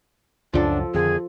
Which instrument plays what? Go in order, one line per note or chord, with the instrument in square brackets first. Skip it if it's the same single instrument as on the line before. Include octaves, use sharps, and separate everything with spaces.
[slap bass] C#2 F#2 F#3 [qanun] F3 A4 [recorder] D4
[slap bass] F2 D3 D#3 [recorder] G#4